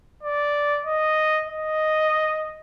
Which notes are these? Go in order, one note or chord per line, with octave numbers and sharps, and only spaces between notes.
D5
D#5
D#5